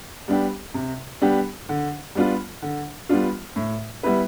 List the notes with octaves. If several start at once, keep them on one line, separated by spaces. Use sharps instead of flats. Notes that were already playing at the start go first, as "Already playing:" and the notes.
G3 B3 D4 G4
C3
G3 B3 D4 G4
D3
G3 B3 D4 F4
D3
G3 B3 D4 F4
A2
G3 B3 E4 B4